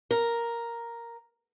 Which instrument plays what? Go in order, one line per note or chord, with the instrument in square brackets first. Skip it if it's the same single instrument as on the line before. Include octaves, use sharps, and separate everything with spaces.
[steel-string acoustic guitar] A#4